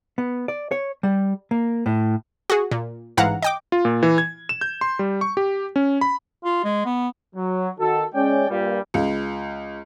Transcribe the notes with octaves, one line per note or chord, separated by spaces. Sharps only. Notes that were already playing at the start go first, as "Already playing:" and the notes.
B3
D5
C#5
G3
A#3
A2
F#4 G#4
A#2
A1 G#2 E3 F5 F#5 A#5
D#5 G5 D6
F4
A#2
E3
G#6
E7
G6
C6
G3
C#6
G4
C#4
B5
F4
G#3
B3
F#3
D#3 F#4 A4
G#3 C#4 D5 G5
G2 A#2 G3
C#2